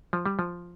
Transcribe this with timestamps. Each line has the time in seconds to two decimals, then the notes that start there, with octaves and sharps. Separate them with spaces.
0.13 F3
0.26 G3
0.39 F3